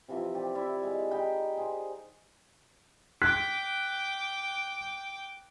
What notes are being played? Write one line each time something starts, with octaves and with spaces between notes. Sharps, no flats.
C3 E3 F3 E5
G4 D5
E4 D5 E5
G#3 F5
D#4 G5 B5
G#4 C5
G5 D6 F#6 B6